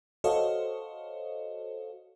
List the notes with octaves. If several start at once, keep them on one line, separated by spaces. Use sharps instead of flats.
F#4 A4 C5 C#5 D#5 F5